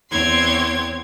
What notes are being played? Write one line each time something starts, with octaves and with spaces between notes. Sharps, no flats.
E2 C4 C#5 C6 G#6